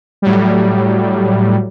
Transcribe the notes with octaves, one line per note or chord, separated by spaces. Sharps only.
A2 F#3 G3